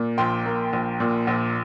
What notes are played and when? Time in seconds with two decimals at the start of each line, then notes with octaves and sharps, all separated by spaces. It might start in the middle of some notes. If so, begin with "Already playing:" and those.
Already playing: A#2
0.18 A#1 G5 C6
0.46 A#3
0.73 A#1
1.00 A#2
1.27 A#1